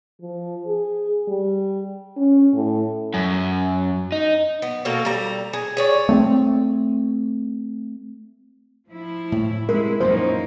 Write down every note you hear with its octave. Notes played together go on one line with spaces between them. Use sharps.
F3
G#4
G3
C#4
A2
F#2
D#4
B3
B2 A#3 A4 A#4
G3 A#5
G#4
G#4 C#5 D5
A3 B3 C4
F3 E4
A2
C3 G#3 E4 A#4
F#2 A#2 F3 A#3 C#4 D#4 C5